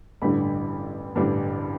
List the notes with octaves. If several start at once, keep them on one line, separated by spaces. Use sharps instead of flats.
A1 G2 D3 G3 D4 B5
A1 G2 D3 G3 D4